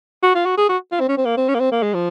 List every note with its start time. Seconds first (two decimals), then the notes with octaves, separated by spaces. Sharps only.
0.23 F#4
0.35 F4
0.46 F#4
0.58 G#4
0.69 F#4
0.92 F4
1.00 C4
1.09 C#4
1.18 C4
1.26 A#3
1.37 C4
1.49 C#4
1.55 A#3
1.60 C4
1.72 A#3
1.83 G#3
1.94 F3